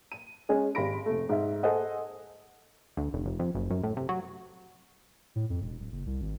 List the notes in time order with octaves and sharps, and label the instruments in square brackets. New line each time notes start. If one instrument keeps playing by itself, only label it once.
[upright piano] D#7
G#3 C#4 G#4
G#1 G4 B5 A#6 D7
F1 A3
G#2 E5
G#4 A4 C5 D#5 F#5
[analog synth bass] D2
F1
F1
F2
F#1
F#2
A2
C3
F#3
[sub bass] A2
F2
E1
D1
F#1
C2
G#1